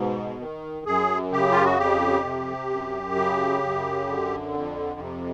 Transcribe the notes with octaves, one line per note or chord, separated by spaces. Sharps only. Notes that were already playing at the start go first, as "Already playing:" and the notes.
Already playing: G#2 B2
D#3
F#2 G#4
C#3 G4
F4
F#4
F2 G4
C3
F#2
C#3
F#2
D3
F2
C3